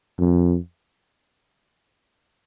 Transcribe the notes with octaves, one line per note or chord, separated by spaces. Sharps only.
F2